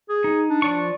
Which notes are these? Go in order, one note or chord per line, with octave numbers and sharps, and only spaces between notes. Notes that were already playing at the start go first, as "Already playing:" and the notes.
G#4
D#4
D4
F3 D5 C#6